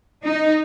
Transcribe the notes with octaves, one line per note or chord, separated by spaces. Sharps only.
D#4